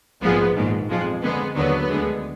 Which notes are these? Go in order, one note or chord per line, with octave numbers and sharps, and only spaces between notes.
A#1 G#2 F3 G#3 B3
A#1 G#2 D#3
F2 F3 G#3
F2 D3 G#3 B3
D#2 D3 F#3 B3
D2 D3 G#3